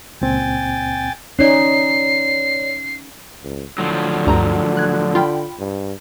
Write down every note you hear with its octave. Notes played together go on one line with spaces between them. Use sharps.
C#2 A#2 C4 G5 G#5 A6
C#4 D#4 C#5 D5 C7
C#2
A2 D3 F3 F#3
D2 G2 A#5
F#6 G#6
F4 G5 B5
G2